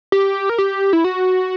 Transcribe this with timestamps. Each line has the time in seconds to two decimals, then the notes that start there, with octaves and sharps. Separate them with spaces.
0.12 G4
0.49 A#4
0.58 G4
0.93 E4
1.04 F#4